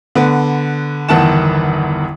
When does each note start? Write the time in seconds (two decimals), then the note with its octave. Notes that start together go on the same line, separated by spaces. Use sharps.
0.15 D3 B3
1.09 G1 E2 D#3 F#5 A5 E7